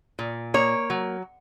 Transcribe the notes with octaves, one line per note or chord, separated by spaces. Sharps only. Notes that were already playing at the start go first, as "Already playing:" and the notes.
A#2
A#3 C#5
F#3